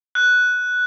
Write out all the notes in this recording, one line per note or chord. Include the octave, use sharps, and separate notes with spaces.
F#6